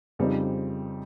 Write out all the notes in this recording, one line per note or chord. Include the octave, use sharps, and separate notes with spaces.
F2 C#3 G3 C4 D#4